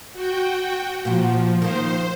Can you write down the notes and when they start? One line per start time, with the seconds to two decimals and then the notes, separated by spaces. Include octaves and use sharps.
0.13 F#4 G5
1.05 A#2 F3 F#4
1.62 D#3 A#3 C5